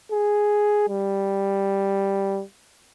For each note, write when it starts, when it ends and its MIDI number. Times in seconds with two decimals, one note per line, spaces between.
0.12 0.84 68
0.89 2.42 55